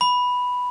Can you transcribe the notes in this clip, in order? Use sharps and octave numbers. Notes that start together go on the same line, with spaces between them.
B5